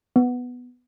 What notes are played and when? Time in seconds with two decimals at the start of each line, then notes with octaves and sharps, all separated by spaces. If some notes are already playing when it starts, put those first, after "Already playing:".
0.16 B3